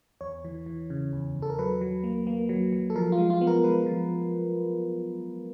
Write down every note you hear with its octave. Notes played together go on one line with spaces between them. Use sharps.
E2 C#5
E3
E3
C#3
E2
E2
A4
A#4
F#3 B4
F#3
A#3
A#3
F#3
F#3
A4
F3 A#4
F4
G#3
F4
B3
A#4
G#3 B4
F3